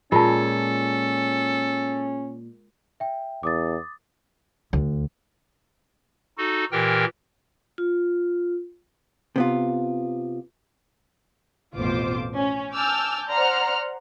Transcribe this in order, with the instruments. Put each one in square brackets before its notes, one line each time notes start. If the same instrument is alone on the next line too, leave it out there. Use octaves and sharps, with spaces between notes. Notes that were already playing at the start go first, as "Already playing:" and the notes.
[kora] A#2 G#3 [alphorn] C#4 [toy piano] F4 A5 [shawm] A4
[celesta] E5 G5
[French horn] E2 [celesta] D6 D#6 A6
[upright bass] D2
[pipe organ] D#4 F#4 A4
A#2 E3 G4 A#4 G5 F6
[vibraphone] F4
[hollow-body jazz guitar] C3 B3 F4
[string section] A1 F2 B2 F4 C5 D6
C#4
G#5 A5 D6 E6 F6 G6
C5 D5 F#5 A#5 C6 F6